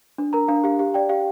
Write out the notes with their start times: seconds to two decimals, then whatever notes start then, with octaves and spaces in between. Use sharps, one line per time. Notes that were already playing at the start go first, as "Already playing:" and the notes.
0.18 D4
0.33 A#4 A#5
0.48 D4 F5
0.64 G4 F5
0.79 G4 F5
0.94 D5 G5
1.09 G4 F5